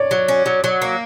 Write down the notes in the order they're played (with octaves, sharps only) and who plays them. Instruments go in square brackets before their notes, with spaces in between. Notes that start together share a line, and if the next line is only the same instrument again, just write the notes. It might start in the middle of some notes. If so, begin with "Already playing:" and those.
Already playing: [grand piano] C#5 D5
[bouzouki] F#3
C#4
F#3
F#3
A#3